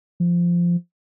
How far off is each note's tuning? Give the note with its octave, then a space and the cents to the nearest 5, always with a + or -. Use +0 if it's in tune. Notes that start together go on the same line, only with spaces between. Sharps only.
F3 -10